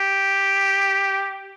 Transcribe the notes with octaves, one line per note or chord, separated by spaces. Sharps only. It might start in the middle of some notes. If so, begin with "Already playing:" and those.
Already playing: G4